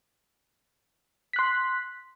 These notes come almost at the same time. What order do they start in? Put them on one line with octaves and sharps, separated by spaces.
B6 F#6 C6